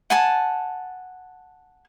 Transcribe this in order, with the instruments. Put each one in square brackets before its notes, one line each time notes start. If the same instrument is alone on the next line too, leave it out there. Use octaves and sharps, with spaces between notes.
[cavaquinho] F#5 G#5 A5